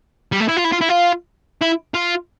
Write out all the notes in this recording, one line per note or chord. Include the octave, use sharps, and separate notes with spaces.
G3
A3
E4
F4
E4
F4
E4
F4
E4
F4